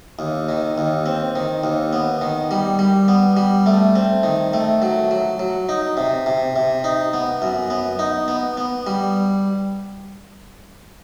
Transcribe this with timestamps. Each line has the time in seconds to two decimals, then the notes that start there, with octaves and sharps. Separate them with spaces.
0.19 D#2
0.49 D#3
0.78 D#2
1.06 C4
1.36 D#3
1.64 D#2
1.93 B3
2.21 D#3
2.51 G3
2.79 G3
3.08 B3
3.37 G3
3.66 A3
3.95 C4
4.23 D#3
4.53 A3
4.82 F#3
5.11 F#3
5.39 F#3
5.69 D#4
5.97 C3
6.26 C3
6.56 C3
6.84 D#4
7.13 B3
7.42 F#2
7.70 B3
7.99 D#4
8.28 B3
8.57 B3
8.87 G3